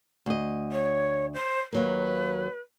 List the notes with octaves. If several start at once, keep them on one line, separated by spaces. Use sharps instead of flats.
D2 D#5
C#5
C5
D#2 F#3 A#3 B4